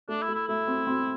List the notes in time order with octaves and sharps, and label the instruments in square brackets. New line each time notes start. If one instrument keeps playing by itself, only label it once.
[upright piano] A3 [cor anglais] D4
[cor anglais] E4
[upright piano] A3
[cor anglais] E4
[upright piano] A3 [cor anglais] E4
[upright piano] C4
C4